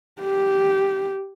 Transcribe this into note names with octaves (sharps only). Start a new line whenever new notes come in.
G4